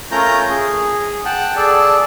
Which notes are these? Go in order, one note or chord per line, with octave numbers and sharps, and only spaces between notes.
A3 C#4 F4 A#4 A#5 G6
G#4
F#5 G5 A5
G#4 A4 D5 A5